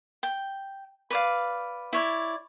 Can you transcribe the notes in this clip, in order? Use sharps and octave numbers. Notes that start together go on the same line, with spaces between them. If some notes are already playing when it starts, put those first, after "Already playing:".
G5
B4 D5 F5
E4 C#5 D5